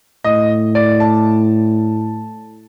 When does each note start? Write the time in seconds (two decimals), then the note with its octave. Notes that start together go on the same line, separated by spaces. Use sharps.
0.24 A2 D#5
0.75 D5
1.00 A5